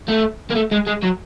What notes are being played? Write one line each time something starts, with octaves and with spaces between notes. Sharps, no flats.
A3
A#3
A3
G#3
G#3
F#3